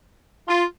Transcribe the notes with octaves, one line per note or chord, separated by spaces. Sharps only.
F4